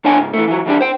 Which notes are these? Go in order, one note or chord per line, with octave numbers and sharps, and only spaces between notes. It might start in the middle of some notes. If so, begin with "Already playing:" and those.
F2 D4 C#5 G5 G#5
C#2 G#2
E3 A3
E3 F#3
E3 G3 D4 G4
C5 G5